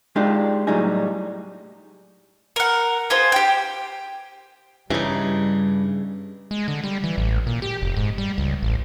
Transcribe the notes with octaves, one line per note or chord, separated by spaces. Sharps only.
G#3 D4 D#4 F4 G4
A2 F#3 G3 D#4 G#4
A#4 F#5
F4 G#4 C5
G4 G5
G2 C#3 E3 G3 D#4
G#3
D3
G3
E3
A1
A#2
G4
F1
G#2
G3
C#2
A1